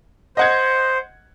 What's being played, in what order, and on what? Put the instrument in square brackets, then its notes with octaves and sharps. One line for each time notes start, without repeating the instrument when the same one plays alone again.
[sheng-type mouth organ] C5 [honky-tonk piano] D#5 F#5 G#6